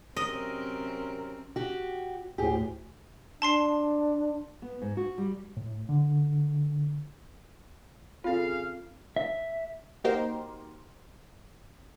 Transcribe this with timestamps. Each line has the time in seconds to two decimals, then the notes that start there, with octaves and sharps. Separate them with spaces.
0.16 C3 F#3 C4 C#4 A#4 D#5
1.56 F#4 G4
2.38 D2 A2 G4 G#4
3.42 D4 A5 C6 C7
4.62 B3
4.82 G#2
4.97 F#4
5.18 G3
5.57 A2
5.89 D3
8.24 C#3 C4 F4 G#4 A4 F5
9.16 E5
10.04 A#3 D#4 F#4 G4 A#4 C5